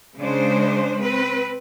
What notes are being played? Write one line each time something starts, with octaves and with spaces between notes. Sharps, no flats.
C#3 G#3 D4 C5
C4 B4